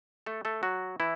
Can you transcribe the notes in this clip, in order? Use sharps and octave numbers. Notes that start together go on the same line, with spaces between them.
A3 A4
A3 A4
F#3 F#4
E3 E4